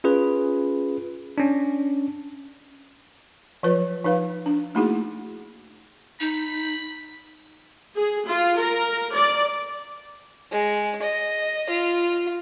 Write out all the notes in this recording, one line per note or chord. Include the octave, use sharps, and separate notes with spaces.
C#4 F4 G#4 B4
C#4 D4
F3 F#3 F4 B4 C#5
F3 D#4 B4 F5
D4
A3 A#3 D#4 E4 F#4 G#4
D#4 B5
G#4
F4
A#4
D5
G#3
D#5
F4